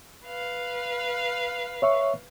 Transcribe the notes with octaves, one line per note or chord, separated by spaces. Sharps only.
B4 F5
C#5 E5 C#6